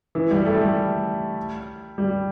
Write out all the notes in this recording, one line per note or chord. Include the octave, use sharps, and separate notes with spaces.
E3
G3
A3
G3
G3